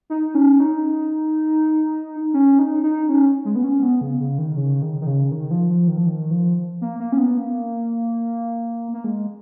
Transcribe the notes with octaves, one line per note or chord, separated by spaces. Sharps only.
D#4
C#4
D#4
C#4
D#4
D#4
C#4
G#3
B3
C#4
B3
C#3
C#3
D#3
C#3
D#3
D#3
C#3
D#3
F3
F3
D#3
F3
D#3
F3
A#3
A#3
C#4
B3
A#3
A#3
G#3